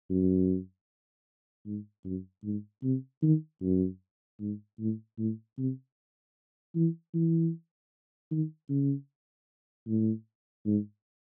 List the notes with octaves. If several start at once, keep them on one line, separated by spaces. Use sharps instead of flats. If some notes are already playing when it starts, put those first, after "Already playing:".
F#2
G#2
F#2
G#2
C3
D#3
F#2
G#2
A2
A2
C3
E3
E3
D#3
C#3
A2
G#2